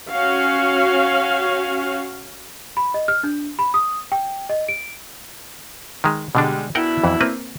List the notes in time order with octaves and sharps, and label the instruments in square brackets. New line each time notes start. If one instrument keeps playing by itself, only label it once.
[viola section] C#4 F#4 F5
[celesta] B5
D#5
F6
D4
B5
D#6
G5
D#5
D7
[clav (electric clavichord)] D#3 G#3
[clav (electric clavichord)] B2 D3 D4 [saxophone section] G3 G#3
[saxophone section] B2 D4 E4 [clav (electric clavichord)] A#4 F#5 G5
[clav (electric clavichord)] F2 E3
A#3 C4 B4